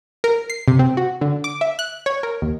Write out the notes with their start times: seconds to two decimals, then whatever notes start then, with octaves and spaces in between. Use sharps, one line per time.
0.24 A#4
0.50 C7
0.68 C3
0.79 C4
0.97 F#4
1.21 D3
1.44 D6
1.61 E5
1.79 F#6
2.06 C#5
2.23 A#4
2.42 D#2